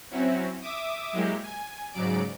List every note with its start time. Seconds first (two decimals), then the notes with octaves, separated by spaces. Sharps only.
0.11 F#3 C4 C#4 E4 F#4
0.61 E5 D6 D#6
1.13 F#3 G#3 A#3 E4 G4
1.42 G#5
1.93 G#2 C#3 F#3 D5 D7